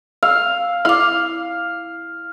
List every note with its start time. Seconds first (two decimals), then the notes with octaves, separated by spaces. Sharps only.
0.23 F5 E6
0.85 E4 F5 D6